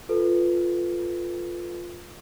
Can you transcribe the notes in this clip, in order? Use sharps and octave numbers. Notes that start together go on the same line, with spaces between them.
F4 A4 B4